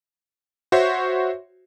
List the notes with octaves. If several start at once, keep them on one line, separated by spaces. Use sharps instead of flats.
F#4 C5 C#5 E5